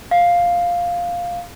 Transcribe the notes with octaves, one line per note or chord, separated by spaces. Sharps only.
F5